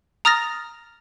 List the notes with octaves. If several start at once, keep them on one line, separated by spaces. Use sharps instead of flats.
A#5 D#6 F6 A6 A#6